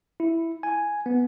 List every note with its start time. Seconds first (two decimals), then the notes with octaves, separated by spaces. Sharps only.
0.20 E4
0.63 G#5
1.06 B3